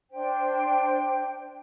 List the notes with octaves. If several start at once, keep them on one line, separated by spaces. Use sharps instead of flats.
D4 C5 G5